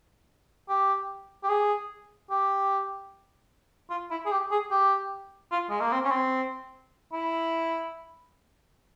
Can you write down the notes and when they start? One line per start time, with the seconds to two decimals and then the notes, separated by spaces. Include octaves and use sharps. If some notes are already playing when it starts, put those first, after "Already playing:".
0.69 G4
1.44 G4
1.49 G#4
2.30 G4
3.90 F4
4.11 E4
4.26 G#4
4.31 G4
4.51 G#4
4.71 G4
5.52 F4
5.70 G#3
5.80 A#3
5.92 C4
6.05 C#4
6.12 C4
7.13 E4